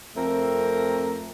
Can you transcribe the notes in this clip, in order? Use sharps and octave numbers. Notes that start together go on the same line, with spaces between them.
F2 A3 C4 A#4